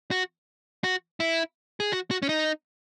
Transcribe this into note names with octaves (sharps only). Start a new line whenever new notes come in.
F#4
F#4
E4
G#4
F#4
F#4
C#4
D#4